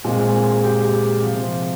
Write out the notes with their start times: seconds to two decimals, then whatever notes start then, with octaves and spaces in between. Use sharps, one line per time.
0.04 A#2 G#3 C4 G#4
0.63 G4
1.22 C3 F3 C4